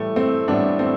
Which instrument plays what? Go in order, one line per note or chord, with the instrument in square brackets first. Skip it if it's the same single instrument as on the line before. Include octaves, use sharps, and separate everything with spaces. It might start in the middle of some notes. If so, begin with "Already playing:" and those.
Already playing: [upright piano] A2 E3 G3 A3
A3 C4
A2 E3 G3 B3 D4
A3 C4